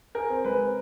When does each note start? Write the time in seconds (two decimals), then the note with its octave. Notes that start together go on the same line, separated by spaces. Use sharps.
0.15 G#4 A#4
0.30 C4
0.44 G#3 B4
0.60 C4